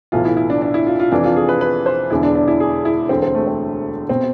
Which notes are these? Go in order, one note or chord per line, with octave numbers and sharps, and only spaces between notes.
B1 A2 E3 F4
E4
E4
D4
D4
E4
F4
F4
F1 F2 E3 D4
F4
G#4
B4
B4
C5
E1 E2 D3 E4
D4
D4
E4
G#4
E4
E1 D2 D3 C4
C4
A3
C4
B2 C4